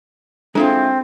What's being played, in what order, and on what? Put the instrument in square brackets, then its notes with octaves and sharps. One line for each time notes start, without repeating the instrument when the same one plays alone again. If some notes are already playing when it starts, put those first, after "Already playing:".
[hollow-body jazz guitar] G#3 E4 F4 [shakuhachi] C4 [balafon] D4 A4